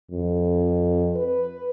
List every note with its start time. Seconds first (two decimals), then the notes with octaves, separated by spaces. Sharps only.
0.11 F2
1.16 B4